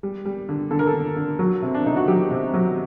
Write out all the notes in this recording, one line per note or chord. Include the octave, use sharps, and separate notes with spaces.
G3
G3
D3
D3 A4
A#4
A4
D3
D3
F#3
C3 C4
D4
C3 D#4
F#4
F#3 G4
C3
F#3